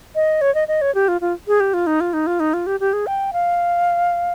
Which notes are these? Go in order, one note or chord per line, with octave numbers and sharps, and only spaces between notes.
D#5
C#5
D#5
D#5
C#5
G4
F4
F4
G#4
G4
F4
D#4
F4
D#4
F4
D#4
F4
G4
G4
G#4
G5
F5